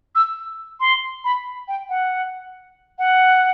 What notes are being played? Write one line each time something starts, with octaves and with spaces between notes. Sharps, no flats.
E6
C6
B5
G5
F#5
F#5